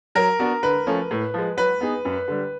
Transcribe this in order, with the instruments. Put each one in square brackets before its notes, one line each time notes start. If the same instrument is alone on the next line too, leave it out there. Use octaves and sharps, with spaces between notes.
[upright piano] F#3 [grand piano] A#4
[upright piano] B3 D4 F#4
[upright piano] D3 [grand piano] B4
[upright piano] F3 A3 C#4
A2
F3 G#3
[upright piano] F#3 [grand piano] B4
[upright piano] B3 D#4 G#4
F#2
D3 G3